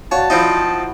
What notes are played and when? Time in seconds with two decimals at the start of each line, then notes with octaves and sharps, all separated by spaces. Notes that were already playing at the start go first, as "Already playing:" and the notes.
0.12 F#4 C#5 D5 F5 A5
0.30 F3 C4 D#4 E4